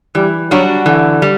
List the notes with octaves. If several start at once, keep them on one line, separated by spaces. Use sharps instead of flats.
E3 G3
F#3 G3 D4 F#4
D3 E3
G3